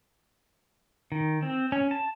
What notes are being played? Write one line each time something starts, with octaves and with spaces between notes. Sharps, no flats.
D#3
C4
C#4
A5